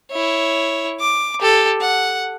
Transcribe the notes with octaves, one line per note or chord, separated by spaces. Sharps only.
E4 C#5
D6
G4 A4
F#5